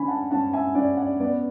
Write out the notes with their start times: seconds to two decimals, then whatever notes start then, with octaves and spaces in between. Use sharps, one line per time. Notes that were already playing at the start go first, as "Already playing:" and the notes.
Already playing: D3 C#4 G#5 B5
0.08 F#5 A5
0.31 C#4 F#5 A5
0.53 E5 G#5
0.75 C#4 D5 F#5
0.97 D5 F#5
1.20 B3 B4 D5